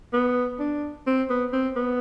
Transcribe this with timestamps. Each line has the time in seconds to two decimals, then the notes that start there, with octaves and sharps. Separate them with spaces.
0.13 B3
0.59 D4
1.07 C4
1.30 B3
1.53 C4
1.76 B3